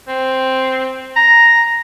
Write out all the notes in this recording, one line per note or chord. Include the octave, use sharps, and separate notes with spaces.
C4
A#5